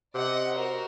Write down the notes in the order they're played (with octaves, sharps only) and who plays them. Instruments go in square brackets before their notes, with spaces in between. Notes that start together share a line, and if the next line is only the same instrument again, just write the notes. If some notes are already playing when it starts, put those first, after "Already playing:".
[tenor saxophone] C3 [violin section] D5 D#5 F#5
[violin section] F#4 A#4 C5